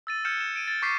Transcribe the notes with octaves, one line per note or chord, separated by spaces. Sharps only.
E6 A6 D#7
F6 G6 G#6 C#7 E7
E7
D7 D#7
A6
C#6 D6 G6 B6 C7